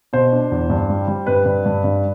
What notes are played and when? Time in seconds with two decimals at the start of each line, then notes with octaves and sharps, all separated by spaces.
0.13 B2 C5
0.32 D4
0.52 E2
0.70 G2
0.90 G3
1.08 G3
1.27 G2 B4
1.45 G2
1.66 G2
1.84 G2